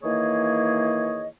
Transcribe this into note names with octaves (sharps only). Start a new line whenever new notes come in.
D#3 E3 A#3 G#4 C#5 D#5